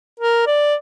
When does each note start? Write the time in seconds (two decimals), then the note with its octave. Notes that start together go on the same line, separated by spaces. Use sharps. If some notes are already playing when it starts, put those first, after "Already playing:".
0.20 A#4
0.47 D5